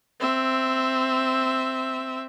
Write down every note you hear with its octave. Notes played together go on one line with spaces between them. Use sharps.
C4 E5